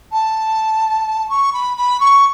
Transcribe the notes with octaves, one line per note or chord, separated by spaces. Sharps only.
A5
C#6
B5
B5
C#6